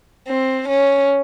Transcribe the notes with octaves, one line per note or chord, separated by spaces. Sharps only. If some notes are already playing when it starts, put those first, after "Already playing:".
C4
C#4